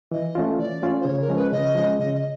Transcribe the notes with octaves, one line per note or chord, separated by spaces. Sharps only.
E3 D#5
A3 C#4 F4
E3 D5
A3 C#4 F4
C5
C#3 C#5
A#4
F3 G#3 C#4
B4
C#3 D#5
F3 G#3 C#4
C#3 D#5
D#5